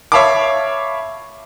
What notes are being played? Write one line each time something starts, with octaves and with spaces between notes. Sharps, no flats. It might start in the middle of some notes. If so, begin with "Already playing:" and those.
C#5 E5 F5 A5 B5 D6